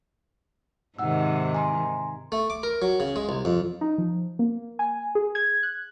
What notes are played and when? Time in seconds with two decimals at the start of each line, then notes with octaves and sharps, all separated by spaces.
0.99 G#2 C3 D#3 F#5 E6
1.54 G#5 A#5 C6
2.32 A3
2.50 D6
2.63 A#4
2.82 F#3
3.00 C#3
3.16 G#3
3.29 C2
3.45 F2
3.81 D#4
3.98 F3
4.39 A#3
4.79 G#5
5.15 G#4
5.35 G#6
5.63 F#6